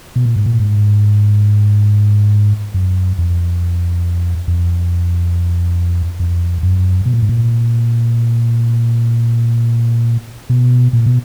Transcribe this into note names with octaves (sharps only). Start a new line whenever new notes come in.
B2
A#2
G#2
A#2
G#2
F#2
F2
F2
F2
F#2
B2
A#2
G#2
A#2
B2
A#2
B2